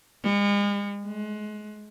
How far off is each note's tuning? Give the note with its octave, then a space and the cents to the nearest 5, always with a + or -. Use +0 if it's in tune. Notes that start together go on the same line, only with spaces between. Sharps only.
G#3 -40
G#3 +30